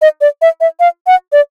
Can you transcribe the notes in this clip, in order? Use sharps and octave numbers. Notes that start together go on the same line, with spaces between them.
D#5
D5
E5
E5
F5
F#5
D5